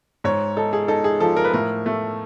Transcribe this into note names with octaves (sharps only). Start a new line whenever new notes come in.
G#2 C#5
D#4 A4
G#4
D#4 A4
G#4
F3 A4
A#4
B4
A2 A#4
A3